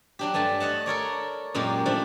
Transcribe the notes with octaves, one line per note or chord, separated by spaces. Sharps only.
F#3 D4 G4
G2 A3 G#5 A5
C#5 D#5 F#5 A5
A4 A#4 C#5 D5
F#2 A#2 G#3 G4
F3 A3 D4